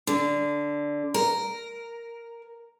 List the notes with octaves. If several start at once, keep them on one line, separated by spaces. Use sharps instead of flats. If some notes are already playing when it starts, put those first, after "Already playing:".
D3
A#4